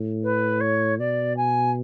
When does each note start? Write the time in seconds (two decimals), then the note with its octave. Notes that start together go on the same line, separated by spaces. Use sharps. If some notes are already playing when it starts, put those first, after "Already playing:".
Already playing: A2
0.23 B4
0.61 C#5
0.99 B2 D5
1.37 G#5